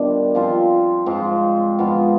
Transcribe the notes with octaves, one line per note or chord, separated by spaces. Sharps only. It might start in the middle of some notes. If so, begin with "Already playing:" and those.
Already playing: B2 D#3 G3 B3 D4 F4
F3 C4 F4
G#2 F3 C4
G#2 F3 B3 F4